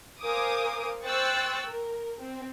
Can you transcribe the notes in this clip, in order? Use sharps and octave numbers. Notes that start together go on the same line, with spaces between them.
A#4 C5 F5 G#5 D6 D#6
C5 G5 C#6 E6 F#6 A6
A#4
C4